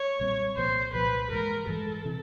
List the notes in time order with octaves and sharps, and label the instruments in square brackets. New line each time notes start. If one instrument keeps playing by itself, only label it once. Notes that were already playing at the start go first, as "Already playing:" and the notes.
Already playing: [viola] C#5
[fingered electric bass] B1 A#2 G3 C4
[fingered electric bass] C2 A#2 F3 A#3 [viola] C5
[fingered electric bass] C2 A#2 F3 A#3 [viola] B4
[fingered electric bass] G#2 E3 G#3 [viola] A#4
[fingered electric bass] G#2 E3 G#3 [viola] A4
[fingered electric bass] C3 E3